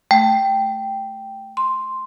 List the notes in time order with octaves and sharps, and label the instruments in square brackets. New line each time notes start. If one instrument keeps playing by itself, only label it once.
[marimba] A3 [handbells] G5
[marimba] C6